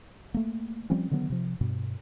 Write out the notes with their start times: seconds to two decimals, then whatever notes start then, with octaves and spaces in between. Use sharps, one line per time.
0.34 A3 A#3
0.90 F3 G3 C4 C#4
1.11 D3 D#3 F#3 B3
1.30 C3 F3
1.61 G2 B2